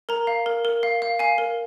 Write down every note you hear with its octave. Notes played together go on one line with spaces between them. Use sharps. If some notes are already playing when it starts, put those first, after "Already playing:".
A#4 A#5
F5
A#4
A#4
F5
F5
F5 G#5
A#4